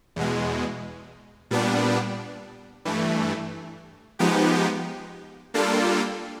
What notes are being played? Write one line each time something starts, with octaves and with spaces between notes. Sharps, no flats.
E2 B2 G#3
A#2 G3 B3 D4
G2 E3 A3
F3 G#3 B3 D#4 G4
G3 A#3 D4 F4 A4